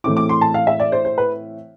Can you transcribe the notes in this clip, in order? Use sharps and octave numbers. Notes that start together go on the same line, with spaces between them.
A2 E3 A3 C4 E4 D6
D6
C6
A5
F5
E5
D5
C5
C5
B4